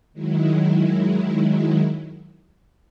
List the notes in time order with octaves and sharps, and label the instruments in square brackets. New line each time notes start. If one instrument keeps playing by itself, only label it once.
[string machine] D#3 F#3 G#3 E4